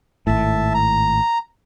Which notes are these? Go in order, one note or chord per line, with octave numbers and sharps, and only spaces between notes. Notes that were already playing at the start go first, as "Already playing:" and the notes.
G#1 A2 E5 A5
A#5